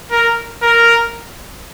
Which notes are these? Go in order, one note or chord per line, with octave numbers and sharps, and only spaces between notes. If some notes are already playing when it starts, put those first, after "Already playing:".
A#4
A#4